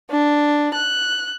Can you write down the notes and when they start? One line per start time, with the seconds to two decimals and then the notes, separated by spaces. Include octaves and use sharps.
0.11 D4
0.74 F#6